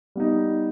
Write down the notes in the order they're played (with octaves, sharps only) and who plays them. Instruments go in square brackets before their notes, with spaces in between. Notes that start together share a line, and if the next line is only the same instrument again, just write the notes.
[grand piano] G3 B3 D#4